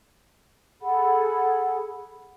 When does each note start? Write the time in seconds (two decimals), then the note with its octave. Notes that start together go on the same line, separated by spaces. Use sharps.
0.81 G#4 A4 F#5 B5